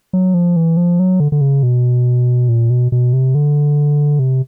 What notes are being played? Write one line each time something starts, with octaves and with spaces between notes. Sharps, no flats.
F#3
F3
E3
F3
F#3
D3
D3
C#3
B2
A#2
B2
B2
C3
D3
C3